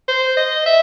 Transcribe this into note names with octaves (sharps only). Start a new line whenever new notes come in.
C5
D#5
E5